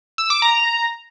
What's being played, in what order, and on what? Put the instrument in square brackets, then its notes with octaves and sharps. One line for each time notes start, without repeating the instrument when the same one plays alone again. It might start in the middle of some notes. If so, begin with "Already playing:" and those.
[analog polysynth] E6
D6
A#5